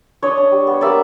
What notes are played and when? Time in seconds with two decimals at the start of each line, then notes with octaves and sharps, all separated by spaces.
0.22 D4 C#5 D#5
0.37 D4
0.52 G3
0.67 B3
0.81 A#3 D5 E5